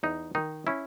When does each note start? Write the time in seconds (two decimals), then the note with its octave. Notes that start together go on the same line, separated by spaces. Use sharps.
0.03 E2 D#4
0.35 D#3 D#4
0.67 C#4 E4